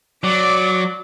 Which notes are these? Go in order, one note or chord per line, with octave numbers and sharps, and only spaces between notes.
F#3 D5 D6